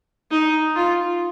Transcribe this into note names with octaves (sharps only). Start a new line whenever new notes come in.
D#4
F4